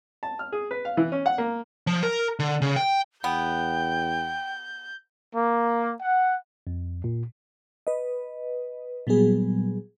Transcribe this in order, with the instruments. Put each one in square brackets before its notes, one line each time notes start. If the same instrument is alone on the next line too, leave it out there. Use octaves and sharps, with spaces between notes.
[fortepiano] A5
F6
G#4
B4
F5
E3
C#4
F#5
A#3
[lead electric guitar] F3
A#4
D3
C#3
G5
[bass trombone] E2 [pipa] B3 [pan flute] G5 [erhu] G6
[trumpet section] A#3
F#5
[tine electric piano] F2
A#2
[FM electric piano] B4 D#5
A#2 F#3 G3 B3 G#4